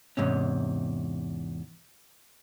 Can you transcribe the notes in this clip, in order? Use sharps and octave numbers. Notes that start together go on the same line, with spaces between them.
E2 G#2 C3 C#4